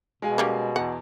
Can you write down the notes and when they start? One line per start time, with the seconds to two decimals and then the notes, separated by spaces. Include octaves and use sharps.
0.22 B2 G#3 F5 G#5
0.38 G3 A#3 C#4
0.76 E2 F#5